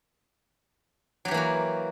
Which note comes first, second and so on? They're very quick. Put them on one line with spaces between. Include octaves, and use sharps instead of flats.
F#3 G4 E3 A#3 F#4